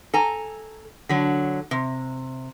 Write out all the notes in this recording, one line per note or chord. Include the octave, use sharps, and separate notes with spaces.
A4 G#5 A#5
D3 F#3
C3